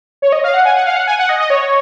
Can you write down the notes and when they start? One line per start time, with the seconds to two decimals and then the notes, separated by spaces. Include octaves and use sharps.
0.22 C#5
0.32 D#5
0.44 F5
0.54 F#5
0.65 G#5
0.76 F#5
0.86 F5
0.96 F#5
1.07 G#5
1.19 F#5
1.29 D#5
1.40 D#5
1.50 C#5